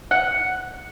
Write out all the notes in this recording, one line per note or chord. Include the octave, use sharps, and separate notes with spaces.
F#5